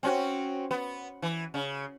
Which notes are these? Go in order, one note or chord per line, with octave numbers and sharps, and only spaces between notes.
C4 C#4 F#4
B3
E3
C#3